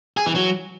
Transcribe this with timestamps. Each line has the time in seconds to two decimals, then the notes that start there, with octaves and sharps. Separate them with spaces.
0.17 G#4
0.26 E3
0.35 F#3